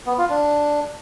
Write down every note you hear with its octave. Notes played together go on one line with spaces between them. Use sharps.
B3
F4
D4